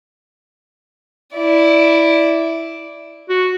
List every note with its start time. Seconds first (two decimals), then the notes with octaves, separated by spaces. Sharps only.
1.34 E4 D5
3.29 F#4